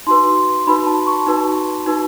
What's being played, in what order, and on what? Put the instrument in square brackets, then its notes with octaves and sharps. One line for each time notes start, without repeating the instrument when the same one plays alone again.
[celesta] D#4 F#4 B4 C6
D#4 F#4 B4 B5
A5
C#6
D#4 F#4 B4
D#4 F#4 B4